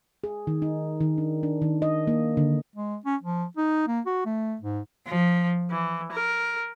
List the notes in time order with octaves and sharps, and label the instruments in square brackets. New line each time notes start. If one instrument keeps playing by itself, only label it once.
[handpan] G#4
D#3
D#4
D#3
D4
D4
D#3
D#5
A#3
D3
[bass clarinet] G#3
C#4
F3
D#4
A#3
F#4
A3
G#2
[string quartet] F3
E3
A#4